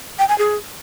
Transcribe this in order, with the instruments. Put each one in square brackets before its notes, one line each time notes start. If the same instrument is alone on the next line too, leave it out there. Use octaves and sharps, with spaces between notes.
[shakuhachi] G5
G#5
G#4